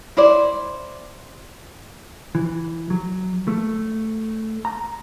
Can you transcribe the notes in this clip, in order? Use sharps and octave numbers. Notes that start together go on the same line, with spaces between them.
E4 C5 D5
E3
F#3
A3
A#5